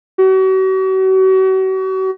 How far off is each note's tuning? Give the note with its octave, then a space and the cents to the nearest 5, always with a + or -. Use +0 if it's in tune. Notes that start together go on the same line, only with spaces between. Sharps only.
F#4 +40